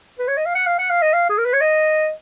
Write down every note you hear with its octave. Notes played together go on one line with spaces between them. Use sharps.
B4
C#5
D#5
F5
F#5
F5
F#5
F5
D#5
F5
G#4
A#4
B4
C#5
D#5